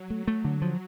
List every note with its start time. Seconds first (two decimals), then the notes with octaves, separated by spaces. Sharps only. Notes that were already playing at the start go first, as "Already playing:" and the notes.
Already playing: F#3
0.10 A3
0.28 A3
0.45 D3
0.62 F3